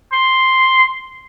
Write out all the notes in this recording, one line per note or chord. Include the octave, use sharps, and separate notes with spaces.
C6